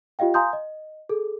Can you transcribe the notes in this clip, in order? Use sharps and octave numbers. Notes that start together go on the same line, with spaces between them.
F4 G4 D#5 F5 G5
F5 G#5 A#5 C6 D#6 G6
D#5
G#4 A4